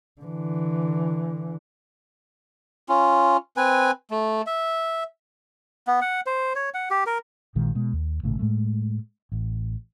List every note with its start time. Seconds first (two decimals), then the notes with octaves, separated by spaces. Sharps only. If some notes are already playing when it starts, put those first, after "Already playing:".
0.22 D3 E3
2.89 C#4 F4
3.57 C4 B4 G#5
4.11 A3
4.47 E5
5.87 B3
6.02 F#5
6.26 C5
6.55 C#5
6.74 F#5
6.91 G4
7.06 A#4
7.55 A#1 A#2 D#3 G#3
7.75 B2 G#3
7.93 D#2
8.23 G#1 A#2 C#3 A3
8.39 A2 G#3 A3
9.32 A1